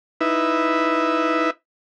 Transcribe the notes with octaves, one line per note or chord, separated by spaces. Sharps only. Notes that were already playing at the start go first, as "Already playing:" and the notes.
D#4 E4 B4 E5